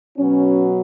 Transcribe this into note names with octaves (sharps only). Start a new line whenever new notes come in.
B2 F#3 B3 C#4